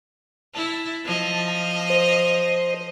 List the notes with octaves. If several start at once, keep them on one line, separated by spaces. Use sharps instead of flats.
E4 A5
F3 D#5
C5